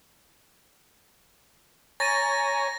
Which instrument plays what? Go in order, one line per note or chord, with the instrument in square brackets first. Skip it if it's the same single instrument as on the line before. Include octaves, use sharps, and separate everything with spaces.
[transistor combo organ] C#5 G#5 A#5 [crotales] A6 A#6 D#7